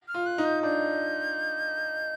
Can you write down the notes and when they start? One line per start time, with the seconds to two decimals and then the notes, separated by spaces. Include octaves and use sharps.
0.08 F6
0.14 F4
0.26 F#6
0.38 D#4
0.45 G6
0.63 D4 G6